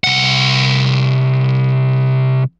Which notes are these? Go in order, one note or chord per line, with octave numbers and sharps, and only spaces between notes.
C2 F#5